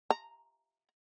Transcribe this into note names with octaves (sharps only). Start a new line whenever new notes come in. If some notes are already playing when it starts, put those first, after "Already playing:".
A#5